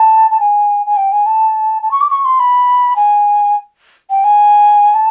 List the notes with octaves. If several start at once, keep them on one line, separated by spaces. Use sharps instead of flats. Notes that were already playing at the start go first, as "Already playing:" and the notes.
Already playing: A5
A5
G#5
G#5
G5
G#5
A5
A5
C#6
D6
C#6
C6
B5
G#5
G5
G#5
A5